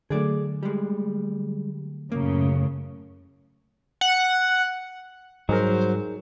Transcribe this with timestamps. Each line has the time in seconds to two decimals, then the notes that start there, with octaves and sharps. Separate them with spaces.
0.10 D3 F#3 A3 G#4 D5
0.63 G3 G#3
2.12 F#2 A2 C#3 A#3
4.01 F#5
5.49 G#2 F#3 G3 D#4 G#4 A#4 C5